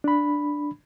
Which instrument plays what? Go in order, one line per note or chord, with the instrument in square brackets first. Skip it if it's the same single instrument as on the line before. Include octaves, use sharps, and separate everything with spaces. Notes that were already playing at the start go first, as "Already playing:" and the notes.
[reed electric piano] D4 B5